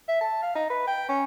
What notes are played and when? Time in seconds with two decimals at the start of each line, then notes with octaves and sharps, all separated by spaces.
0.08 E5
0.21 A5
0.42 F5
0.55 D#4
0.70 B4
0.87 G5
1.09 C#4